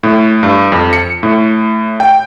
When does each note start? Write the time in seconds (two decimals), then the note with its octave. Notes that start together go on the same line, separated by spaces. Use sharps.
0.03 A2
0.43 G2
0.72 F2
0.93 C#7
1.23 A2
2.00 G5